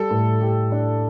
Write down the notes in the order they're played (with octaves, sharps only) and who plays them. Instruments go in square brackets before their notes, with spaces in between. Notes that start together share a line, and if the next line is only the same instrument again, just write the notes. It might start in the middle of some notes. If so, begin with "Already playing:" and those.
Already playing: [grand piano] G3 [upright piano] A4
[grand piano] A2
G4
D4